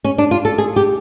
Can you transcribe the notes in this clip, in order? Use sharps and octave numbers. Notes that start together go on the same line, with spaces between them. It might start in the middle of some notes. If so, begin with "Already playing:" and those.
C#4
D4
F4
A4
G#4
G4